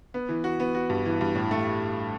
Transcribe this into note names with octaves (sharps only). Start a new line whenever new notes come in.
B3
E3
F#4
B3
F#4
G2
E3
G2
A2
A3